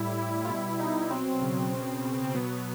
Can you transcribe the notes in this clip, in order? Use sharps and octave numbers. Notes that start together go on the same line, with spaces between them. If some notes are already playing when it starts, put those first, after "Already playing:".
Already playing: A2 G3 E4
G3 E4
F4
B2 E4
B2 D#4
F#3 C4
C#3
B2
B2
C4
F#3 B3